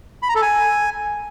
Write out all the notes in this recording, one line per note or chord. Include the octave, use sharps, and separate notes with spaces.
B5
A#5
A4
G#5